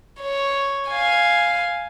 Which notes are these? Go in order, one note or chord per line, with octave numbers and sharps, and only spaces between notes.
C#5
F5 G#5